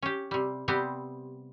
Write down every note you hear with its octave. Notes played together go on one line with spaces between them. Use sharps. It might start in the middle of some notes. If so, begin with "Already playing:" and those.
C#4 G4
C3 G3
C3 G3 B3 C4 G4 C5